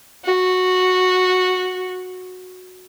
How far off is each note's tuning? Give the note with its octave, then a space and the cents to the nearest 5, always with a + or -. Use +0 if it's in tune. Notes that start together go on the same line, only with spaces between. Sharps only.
F#4 -10